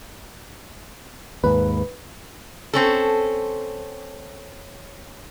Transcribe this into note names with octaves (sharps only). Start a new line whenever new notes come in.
D#2 G#2 B4
C4 C#4 A4